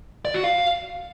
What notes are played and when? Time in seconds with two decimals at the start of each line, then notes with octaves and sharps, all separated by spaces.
0.25 D5
0.34 F#4
0.44 F5